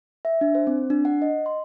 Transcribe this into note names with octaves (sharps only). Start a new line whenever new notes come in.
E5
D4
C5
C4
D4
F#5
D#5
C6